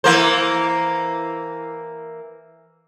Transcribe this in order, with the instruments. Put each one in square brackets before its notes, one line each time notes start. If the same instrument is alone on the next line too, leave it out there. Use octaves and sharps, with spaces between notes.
[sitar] E3 A#3 C5